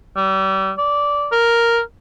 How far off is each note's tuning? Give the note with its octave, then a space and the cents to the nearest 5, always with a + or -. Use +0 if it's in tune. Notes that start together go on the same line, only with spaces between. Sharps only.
G3 -35
D5 -15
A#4 +0